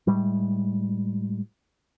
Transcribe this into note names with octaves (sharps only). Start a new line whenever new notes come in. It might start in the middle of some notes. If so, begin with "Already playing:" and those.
A2 G3 G#3